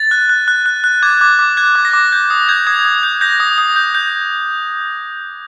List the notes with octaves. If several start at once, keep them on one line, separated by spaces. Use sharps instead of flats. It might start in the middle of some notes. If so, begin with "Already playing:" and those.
Already playing: A6
F#6
F#6
F#6
F#6
F#6
D6 G#6
D6
D6
F#6 G#6
D6
A#6
D6
G6
D#6
G6 G#6
D#6 G#6
D#6
G6
G6 A#6
D#6
D#6
G6
G6